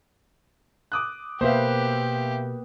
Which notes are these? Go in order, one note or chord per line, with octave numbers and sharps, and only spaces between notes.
D6 D#6 F#6
B2 A#3 B3 G4 B4 C5 E5 F5